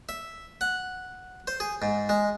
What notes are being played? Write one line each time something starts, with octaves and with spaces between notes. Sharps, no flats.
E5
F#5
C5
G#4
G#2
G#3